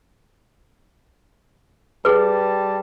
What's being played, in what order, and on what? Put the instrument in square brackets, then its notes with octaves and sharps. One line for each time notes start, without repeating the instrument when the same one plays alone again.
[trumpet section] G3 A5 [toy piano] G#4 B4